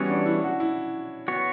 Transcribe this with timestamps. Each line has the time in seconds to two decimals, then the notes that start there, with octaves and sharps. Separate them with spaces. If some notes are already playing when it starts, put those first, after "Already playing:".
Already playing: E3 G3 B3 C#4 F#4 C#5
0.09 D4
0.26 E4
0.44 F#4
0.60 E4
1.28 B3 F#4 C#5